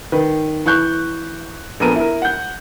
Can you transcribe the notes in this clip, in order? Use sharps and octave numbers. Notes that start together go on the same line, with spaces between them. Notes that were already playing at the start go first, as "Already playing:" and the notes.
D#3 B4
E3 C#6 F#6 G6
A#1 B3 A4 A#4 D#7
E4 A#4
F#5 G6